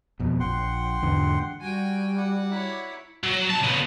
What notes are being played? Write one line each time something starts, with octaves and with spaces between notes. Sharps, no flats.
F2 B2
A#1 F#5 G5 C6
E2 G#2 D3
G3 F#4 G5 G#5
F#4 D5 F#5
E4 C#5
F#3
C2 A5
C#3 B3